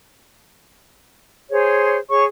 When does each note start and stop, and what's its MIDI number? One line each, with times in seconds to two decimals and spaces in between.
1.51 1.97 68
1.51 1.97 72
1.51 1.97 73
2.09 2.25 68
2.09 2.25 73
2.09 2.25 85